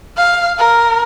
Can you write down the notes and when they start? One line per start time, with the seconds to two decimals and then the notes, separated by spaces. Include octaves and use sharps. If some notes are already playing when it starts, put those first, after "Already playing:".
0.17 F5
0.58 A#4